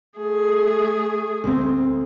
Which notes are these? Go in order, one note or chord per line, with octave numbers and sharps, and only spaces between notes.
A3 G#4
D2 C4